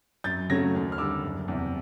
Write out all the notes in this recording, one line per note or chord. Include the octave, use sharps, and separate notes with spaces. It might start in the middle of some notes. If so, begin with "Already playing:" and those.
F#2 G6 A6
C#3 F#3 A3 C#4 G#6 A#6
D#2
F6
D3 G3 D6 E6
F#1
E2 C3